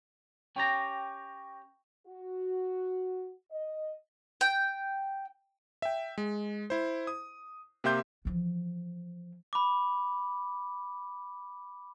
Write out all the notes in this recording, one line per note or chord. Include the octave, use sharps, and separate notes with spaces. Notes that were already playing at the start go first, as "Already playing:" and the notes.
C#4 G4 G5 A#5 C#6 A#6
F#4
D#5
G5
E5 G5
G#3
E4 C5
D#6
C3 A#3 G4 E5 C6 G6
E3 F3
B5 D6